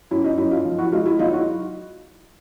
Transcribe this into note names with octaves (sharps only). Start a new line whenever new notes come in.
F#2 E4
D#4
F#2 E4
D#4 F4
F3
E4 F#4
G#3 D#4 F4
E4
F#3 D#4 F4
E4 F#4